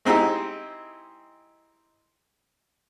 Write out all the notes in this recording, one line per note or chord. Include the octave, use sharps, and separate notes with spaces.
G#3 C4 D#4 E4 G4